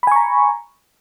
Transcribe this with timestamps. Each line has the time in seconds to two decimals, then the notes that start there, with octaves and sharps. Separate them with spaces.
0.03 B5
0.07 G#5
0.12 C#6
0.16 A#5